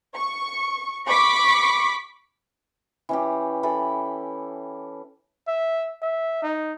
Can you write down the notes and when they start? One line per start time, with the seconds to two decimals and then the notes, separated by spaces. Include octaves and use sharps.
0.16 C#6
1.07 B5 C#6 D6 B6
3.09 E3 C#4 G4
3.63 E3 A4 B5
5.48 E5
6.02 E5
6.43 D#4